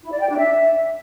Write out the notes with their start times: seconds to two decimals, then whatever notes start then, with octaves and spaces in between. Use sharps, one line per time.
0.03 E4
0.12 D5
0.20 G5
0.29 D4
0.38 E5